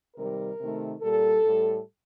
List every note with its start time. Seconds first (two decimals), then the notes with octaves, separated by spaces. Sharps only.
0.16 C3 D#3 G3 A#4
0.60 C3 D#3 A3
1.02 A#2 G3 A4
1.45 A2 G3